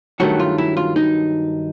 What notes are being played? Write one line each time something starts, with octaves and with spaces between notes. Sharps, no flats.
G2 D#3 F#3 A3 F#4
F4
E4
F4
D#4